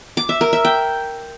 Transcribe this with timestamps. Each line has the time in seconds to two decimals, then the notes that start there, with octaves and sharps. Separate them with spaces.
0.17 D6
0.29 E5
0.41 A#4
0.53 E5
0.65 G5